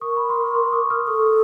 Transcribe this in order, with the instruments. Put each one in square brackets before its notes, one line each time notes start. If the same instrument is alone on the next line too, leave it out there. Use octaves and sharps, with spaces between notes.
[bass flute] A#4 [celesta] C#6 D#6
[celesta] B5
C6
C#6
C6 D6
C#6 D#6
D#6 F6
[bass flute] A4 [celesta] C#6 D#6